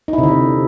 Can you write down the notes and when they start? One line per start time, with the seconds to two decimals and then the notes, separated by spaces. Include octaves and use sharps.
0.08 D#4
0.13 E4
0.18 C3
0.23 D3
0.28 C3